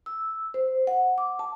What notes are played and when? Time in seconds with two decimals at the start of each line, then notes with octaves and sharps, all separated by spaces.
0.06 E6
0.54 C5
0.87 F#5
1.18 D6
1.39 A5